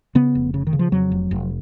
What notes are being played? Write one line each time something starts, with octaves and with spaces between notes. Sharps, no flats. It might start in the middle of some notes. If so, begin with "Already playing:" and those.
C#3 B3
F1
C#3
D#3
C#3
F3
F2 F#3
F1
F1